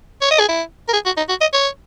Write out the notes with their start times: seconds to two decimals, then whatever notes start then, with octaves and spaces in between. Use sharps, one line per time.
0.22 C#5
0.31 D#5
0.39 G#4
0.49 E4
0.88 A#4
0.93 G#4
1.06 F#4
1.17 D#4
1.29 F#4
1.41 D#5
1.53 C#5